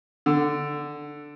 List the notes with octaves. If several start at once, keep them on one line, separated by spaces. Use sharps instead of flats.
D3